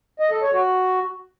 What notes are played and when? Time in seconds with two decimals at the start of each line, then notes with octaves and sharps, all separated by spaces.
0.20 D#5
0.31 A4
0.42 C#5
0.54 F#4